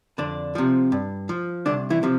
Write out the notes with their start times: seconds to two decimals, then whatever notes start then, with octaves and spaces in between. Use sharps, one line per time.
0.18 F2 D3 D4
0.55 C3 F3
0.92 G2
1.29 F3
1.66 C2 D3 D4
1.90 E3 E4
2.03 C3 F3